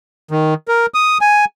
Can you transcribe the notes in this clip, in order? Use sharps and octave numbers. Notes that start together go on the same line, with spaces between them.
D#3
A#4
D#6
G#5